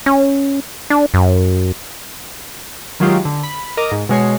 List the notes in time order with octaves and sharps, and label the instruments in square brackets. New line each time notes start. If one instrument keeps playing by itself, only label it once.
[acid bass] C#4
D4
F#2
[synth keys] D#3 F#3 G#3 F4 G4
D3
B5
A#4 D#5 D6
G#2
B2 G#3 C#5 C7